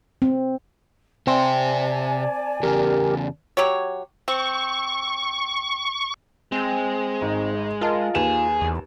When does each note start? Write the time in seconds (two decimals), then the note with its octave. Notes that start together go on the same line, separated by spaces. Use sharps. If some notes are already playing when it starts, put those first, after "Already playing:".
0.22 C4
1.27 C3 C4 D5 E5 G#5 A5
2.63 E2 C#3 G4 A#4
3.57 F#3 G4 C#5
4.28 C4 C#6
6.52 G#3 C4
7.22 G#1 D#4
7.81 F4 A#4 D#5 A5
8.15 D#2 G#4 B4 E7
8.61 E2